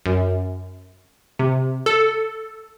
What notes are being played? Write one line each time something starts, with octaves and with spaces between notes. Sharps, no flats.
F#2
C3
A4